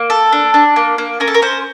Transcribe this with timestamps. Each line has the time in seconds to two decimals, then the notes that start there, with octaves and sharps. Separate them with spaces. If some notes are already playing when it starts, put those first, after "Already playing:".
Already playing: A#3
0.10 A4
0.32 D4
0.54 D4
0.76 A#3
0.98 A#3
1.20 C#4 A#4
1.28 A4
1.34 A#4
1.42 C#4 C5